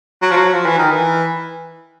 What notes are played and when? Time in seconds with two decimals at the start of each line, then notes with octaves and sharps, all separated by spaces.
0.22 F#3
0.31 F3
0.37 F#3
0.52 F3
0.66 E3
0.78 D#3
0.91 E3